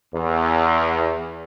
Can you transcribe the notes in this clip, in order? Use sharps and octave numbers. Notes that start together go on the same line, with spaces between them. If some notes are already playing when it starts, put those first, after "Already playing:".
E2